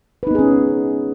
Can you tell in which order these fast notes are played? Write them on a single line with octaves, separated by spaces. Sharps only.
B4 D#4 B3 G#4 C#4